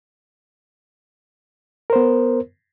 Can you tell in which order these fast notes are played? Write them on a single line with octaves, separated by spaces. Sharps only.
A#4 C5 B3